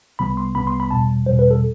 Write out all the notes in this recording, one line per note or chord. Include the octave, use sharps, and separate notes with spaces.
C2 C3 G3 B3 B5
C6
C2 C3 G3 B3 B5
C6
B5
E2 B2 G3 A5
E2 B2 G3 C5
B4
A4